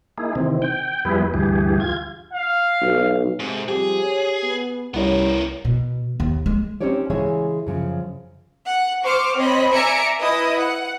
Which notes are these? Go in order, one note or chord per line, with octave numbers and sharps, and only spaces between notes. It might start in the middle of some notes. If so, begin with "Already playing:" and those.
A#3 D#4 E4 G#4
C3 D#3 E3 C4
G5
F2 G3 B3 E4 G#4 B4
D2 G2 E3 G4 G#4
F4 G#6
F5
B1
G#2 C3 C4 A4
F3 G3 C4 G4 G#4
C#5
B3
C2 G3 B3 C#4 E4 A#4 C#5
B2
D#2
G#3
C4 C#4 D#4 G4 C#5 D5
C#3 E3 G#3 G#4 C#5 E5
F#2 C#3 F3
F#5
C5 C#6 D6 F6 C7
C4 C#5 D#5 B5
D5 E5 G#5 A#5 C#7 D7
E4 B4 D#5 D#6
F#5